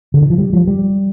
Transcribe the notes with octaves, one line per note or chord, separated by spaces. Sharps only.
D3
D#3
F3
G3
F3
G3